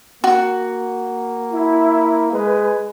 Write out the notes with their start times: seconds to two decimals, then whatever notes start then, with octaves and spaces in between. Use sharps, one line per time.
0.24 A#3 F#4
1.52 E4
2.32 G#3 G#4 B4